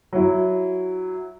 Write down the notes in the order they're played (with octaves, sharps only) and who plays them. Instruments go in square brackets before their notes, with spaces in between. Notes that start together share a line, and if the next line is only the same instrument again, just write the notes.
[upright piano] F#3 E4